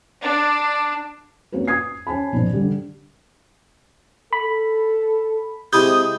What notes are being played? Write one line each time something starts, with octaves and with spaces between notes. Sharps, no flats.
D4
A#3 C4 C#4 F#4 B4
D#6 G#6 C7
C#4 G#5 A5 B5
B1 A#2 F3
D3 G3
A4 B5
C3 G#3 E4 G4 D#6 G6